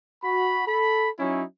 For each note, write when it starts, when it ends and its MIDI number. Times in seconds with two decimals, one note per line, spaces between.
0.23 0.64 66
0.23 0.64 83
0.67 1.09 69
0.67 1.09 83
1.19 1.43 54
1.19 1.43 61
1.19 1.43 63
1.19 1.43 64